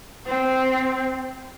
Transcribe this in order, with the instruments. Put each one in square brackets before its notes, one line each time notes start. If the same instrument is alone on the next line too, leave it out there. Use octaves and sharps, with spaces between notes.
[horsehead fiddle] C4